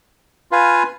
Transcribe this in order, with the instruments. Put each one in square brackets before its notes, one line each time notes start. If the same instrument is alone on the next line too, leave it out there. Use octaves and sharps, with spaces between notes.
[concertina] F4 B4 F5 G#5